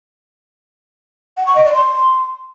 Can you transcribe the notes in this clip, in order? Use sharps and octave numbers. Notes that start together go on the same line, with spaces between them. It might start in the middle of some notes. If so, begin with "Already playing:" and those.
F#5
C#6
D#5
D5
C6